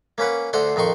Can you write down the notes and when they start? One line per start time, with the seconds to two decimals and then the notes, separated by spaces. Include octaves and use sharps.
0.18 A#3 C#4 B4 F#5
0.53 D2 D3 C5 F#5 C6
0.76 F2 D#3 D#4 C6 C#6